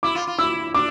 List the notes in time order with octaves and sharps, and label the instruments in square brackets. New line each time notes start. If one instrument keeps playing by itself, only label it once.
[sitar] E4 [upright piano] D6
[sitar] F4
F4
[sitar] E4 [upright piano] E6
[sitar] D4 [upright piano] D6